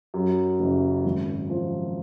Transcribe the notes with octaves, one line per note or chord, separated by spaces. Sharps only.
F#2
F#1
G#1
F3